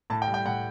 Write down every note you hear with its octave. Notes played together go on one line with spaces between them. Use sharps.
A2 A5
G5
G3
G5
A2 F#5